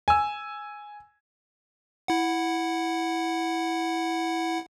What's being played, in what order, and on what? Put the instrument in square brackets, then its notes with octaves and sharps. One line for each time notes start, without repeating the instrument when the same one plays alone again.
[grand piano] G#5 E6
[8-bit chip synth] E4 F#5